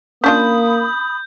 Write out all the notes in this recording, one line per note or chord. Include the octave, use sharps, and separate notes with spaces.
A#3 C#4 D4 F4 B5 D#6 G6